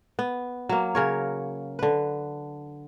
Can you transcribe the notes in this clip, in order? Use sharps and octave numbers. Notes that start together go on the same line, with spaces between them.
B3
F#3 A#3
C#3 A#4 C#5
D3 B4